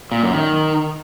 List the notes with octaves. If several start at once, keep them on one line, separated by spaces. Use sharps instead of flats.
A#2
F#2
D#3